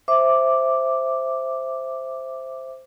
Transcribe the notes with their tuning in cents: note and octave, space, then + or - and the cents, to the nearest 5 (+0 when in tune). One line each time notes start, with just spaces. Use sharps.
C5 +0 E5 +0 D6 +0